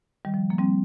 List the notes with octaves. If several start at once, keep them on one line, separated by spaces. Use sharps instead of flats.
D#3 G3
F3
F3 A#3
G3 C4